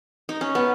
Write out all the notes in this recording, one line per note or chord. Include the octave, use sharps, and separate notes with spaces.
D#4
C#4
B3